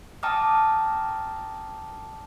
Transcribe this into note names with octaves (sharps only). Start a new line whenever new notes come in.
G5 A5 A#5 D6 D#6 F6